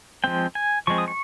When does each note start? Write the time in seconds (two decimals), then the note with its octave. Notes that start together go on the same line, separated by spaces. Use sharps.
0.24 F3 G#3 C4 G5
0.55 G#5
0.87 F3 G#3 C4 C#6
0.98 D#6
1.08 C#6